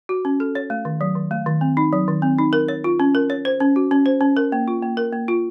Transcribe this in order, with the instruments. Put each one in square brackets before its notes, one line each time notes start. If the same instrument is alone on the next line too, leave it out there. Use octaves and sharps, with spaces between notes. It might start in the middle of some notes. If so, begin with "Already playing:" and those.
[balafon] F#4
C#4
A4
C#5
A3
D#3
F#3
D#3
A3
D#3
C4
D#4
F#3
D#3
C4
D#4
A#4
C#5
F4
C#4
A#4
C#5
C5
C#4
F#4
C#4
C5
C#4
A#4
A#3
F4
A#3
A#4
A#3
F4